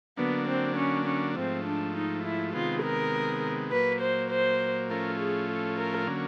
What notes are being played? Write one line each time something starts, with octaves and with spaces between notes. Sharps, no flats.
D3 F#3 A#3 B3 D4
C4
C#4
C#4
G#2 F3 A3 C4
D4
D#4
E4
C3 D#3 G#3 B3 F4
A#4
A#2 F#3 A#3 B4
C5
C5
A2 F3 A3 C#4 F4 A#4
G#4
A4
A#4
D3 F#3 A#3 C#4